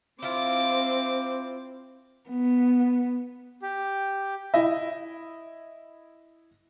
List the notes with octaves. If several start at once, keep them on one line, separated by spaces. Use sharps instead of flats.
C4 E4 F4 D6
B3
G4
E4 D#5 E5